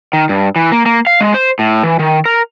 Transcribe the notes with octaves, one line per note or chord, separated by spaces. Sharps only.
D#3
G2
E3
A#3
A#3
F5
G#3
C5
A2
E3
D#3
A#4